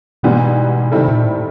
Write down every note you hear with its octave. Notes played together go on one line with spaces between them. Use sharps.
G#2 B2 E3 G3 B3
C3 D#3 G3 C4 E4 A4
A#2
A2